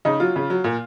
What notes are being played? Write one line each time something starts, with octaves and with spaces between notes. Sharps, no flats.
C#3 D#4
F#3 F4
C#3
F#3
A#2